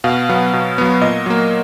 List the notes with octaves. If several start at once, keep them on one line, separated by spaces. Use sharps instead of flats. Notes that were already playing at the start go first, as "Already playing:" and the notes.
B2 F5
F#3 B3
B2
F#3 B3
A#2 D#5
F#3 A#3